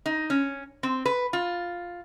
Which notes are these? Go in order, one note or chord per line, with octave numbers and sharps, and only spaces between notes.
D#4
C#4
C4
B4
F4